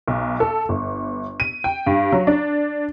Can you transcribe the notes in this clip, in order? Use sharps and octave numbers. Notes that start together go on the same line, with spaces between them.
B1
A4
G1
D#7
G5
G2
F#3
D4